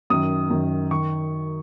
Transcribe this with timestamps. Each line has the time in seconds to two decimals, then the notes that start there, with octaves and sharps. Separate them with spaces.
0.10 F#2 D#3 D#6
0.50 F#2 D#3
0.91 D#3 C#6